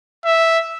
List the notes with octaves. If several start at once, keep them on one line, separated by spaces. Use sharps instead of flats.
E5